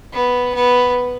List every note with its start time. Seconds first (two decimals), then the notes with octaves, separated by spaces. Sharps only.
0.13 B3
0.54 B3